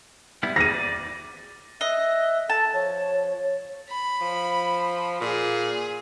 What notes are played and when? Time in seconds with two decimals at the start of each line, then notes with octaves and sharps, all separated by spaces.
0.43 G3 B3 E4
0.56 D#3 E3 A#3 A#6 D#7
0.69 D5
1.81 D#5 E5 F#6
2.50 A4 A5
2.74 F3 C#5
3.90 B5
4.21 F3
5.21 A#2 G#4